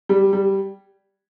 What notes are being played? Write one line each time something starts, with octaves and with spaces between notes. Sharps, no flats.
G3
G3